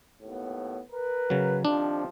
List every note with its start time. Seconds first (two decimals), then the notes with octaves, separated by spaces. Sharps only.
0.21 D#2 A2 B3
0.92 A#4 B4
1.30 C#3 F#3
1.65 C3 D#3 F3 D4